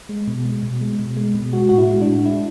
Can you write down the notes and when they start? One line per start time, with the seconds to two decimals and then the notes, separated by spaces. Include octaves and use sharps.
0.09 G#3
0.27 B2
0.45 G#3
0.63 B2
0.81 G#3
0.99 B2
1.17 G#3
1.35 B2
1.53 G#3 F#4
1.69 A2 F#4
1.78 E4
1.89 G#3
2.01 D4
2.07 A2
2.25 G#3 E4